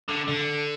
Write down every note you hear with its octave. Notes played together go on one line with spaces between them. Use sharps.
D3
D3